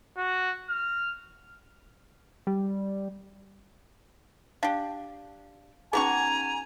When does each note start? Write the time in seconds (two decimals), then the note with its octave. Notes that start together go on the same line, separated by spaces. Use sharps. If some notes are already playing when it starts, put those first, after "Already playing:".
0.17 F#4
0.70 F6
2.47 G3
4.63 D4 G4 F5
5.93 B3 C#4 D#4 F#4 G#4 G#5 A#5 C#6